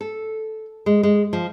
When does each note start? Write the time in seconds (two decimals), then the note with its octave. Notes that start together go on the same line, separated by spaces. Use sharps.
0.01 A4
0.86 G#3
1.03 G#3
1.33 F3